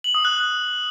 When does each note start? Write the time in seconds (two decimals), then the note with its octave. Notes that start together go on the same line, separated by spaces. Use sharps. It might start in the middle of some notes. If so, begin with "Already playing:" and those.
0.04 F#7
0.15 D#6
0.25 F#6